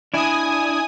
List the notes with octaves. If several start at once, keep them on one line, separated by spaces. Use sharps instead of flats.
D4 E4 G#5 D#6